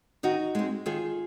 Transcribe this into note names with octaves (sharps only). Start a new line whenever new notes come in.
D#3 D#4 F#4
G#3 C4
D#3 F4 G#4